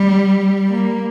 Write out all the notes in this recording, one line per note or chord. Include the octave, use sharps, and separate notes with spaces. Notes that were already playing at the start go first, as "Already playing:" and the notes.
Already playing: G3
A#3